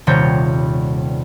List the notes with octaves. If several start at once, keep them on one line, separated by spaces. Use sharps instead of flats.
D#1 C3 G3 C#5 G6